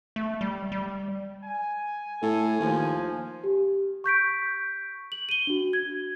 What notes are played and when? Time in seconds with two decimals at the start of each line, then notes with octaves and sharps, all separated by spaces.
0.16 A3
0.41 G3
0.72 G3
1.44 G#5
2.22 A2 A4
2.60 D#2 F3
3.44 G4
4.04 C#6 G6 B6 D7
5.12 F#7
5.29 D#7 G7
5.47 D4 F#4
5.73 G#6